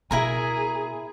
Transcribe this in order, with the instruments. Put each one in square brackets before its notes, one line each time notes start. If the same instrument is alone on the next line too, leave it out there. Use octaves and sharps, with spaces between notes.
[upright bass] B2 [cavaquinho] E4 A#4 A#5 [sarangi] G#4